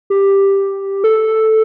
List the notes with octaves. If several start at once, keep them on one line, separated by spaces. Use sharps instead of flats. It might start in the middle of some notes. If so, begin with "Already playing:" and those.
G4
A4